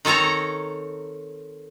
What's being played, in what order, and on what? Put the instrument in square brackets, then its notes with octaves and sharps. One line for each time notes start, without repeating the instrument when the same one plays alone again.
[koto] D#3 C4 A4 C#5 A#5